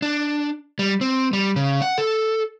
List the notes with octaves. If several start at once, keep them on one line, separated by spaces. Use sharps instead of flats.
D4
G3
C4
G3
C#3
F#5
A4